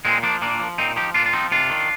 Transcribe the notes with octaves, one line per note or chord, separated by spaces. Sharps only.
A#2 G#3 C4
F3 A#3 D4
A#2 A#3 D4
F3
A#2 C4 D#4
F3 D#4 G4
A#2 D4 F4
F4
F3 C4 D#4
C3 D4 F4
D#3